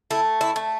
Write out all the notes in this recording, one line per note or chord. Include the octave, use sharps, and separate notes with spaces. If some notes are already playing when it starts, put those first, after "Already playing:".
A3 E4
E4
A3